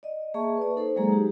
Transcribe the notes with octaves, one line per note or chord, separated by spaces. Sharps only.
D5 D#5
A#3 G#4 E5 A5 C#6
B4 D5
D#4 A4 C5
F#3 G#3 A#3 G#4 A#5
D#4 G4